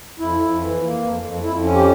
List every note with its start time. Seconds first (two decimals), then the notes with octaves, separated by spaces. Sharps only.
0.19 F2 E4
0.40 F2
0.60 E3
0.81 A#3
1.01 F2
1.22 F2
1.43 F2 E4
1.64 C#4
1.74 G4